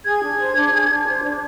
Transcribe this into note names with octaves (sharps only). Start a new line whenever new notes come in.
G#4 G#6
D4
C5
D4
G#4
D4
C5
D4